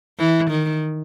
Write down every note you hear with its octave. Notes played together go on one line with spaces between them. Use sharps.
E3
D#3